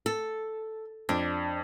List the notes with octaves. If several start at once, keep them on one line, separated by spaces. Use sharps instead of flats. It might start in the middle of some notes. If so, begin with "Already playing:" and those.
A4
F2 D4